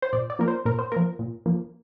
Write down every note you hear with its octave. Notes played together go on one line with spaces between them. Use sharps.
C5
A#2 D5
D5
F3 A#3 A#4
C5
A#2 A#4
C5
F3 A#3 A#4
A#2
F3 A#3